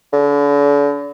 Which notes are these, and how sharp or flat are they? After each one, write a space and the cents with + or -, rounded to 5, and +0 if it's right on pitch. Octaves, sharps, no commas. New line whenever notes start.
D3 -40